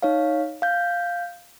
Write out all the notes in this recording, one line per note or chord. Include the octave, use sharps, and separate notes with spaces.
D#4 C#5 F5
F5 G6